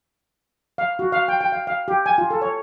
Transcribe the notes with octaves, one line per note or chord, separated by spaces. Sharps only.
F5
F#4
F5
G5
G5
F5
F5
G4
G#5
F4
A4
C#5